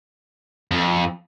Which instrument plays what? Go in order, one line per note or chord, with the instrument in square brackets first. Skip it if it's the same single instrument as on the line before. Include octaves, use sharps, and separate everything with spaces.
[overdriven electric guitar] F2